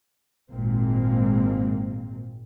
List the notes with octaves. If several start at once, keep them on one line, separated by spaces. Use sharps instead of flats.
G#1 A#2 G#3 A#3 C4